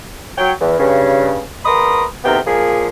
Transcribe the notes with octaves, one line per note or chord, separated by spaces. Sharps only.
F#3 C#5 G5
E2
G2 C#3
E2 A#4 B5 C6 D#6
D2 C3 D#3 B3 A#4 G5
A#2 F3 A#3 F4 G#4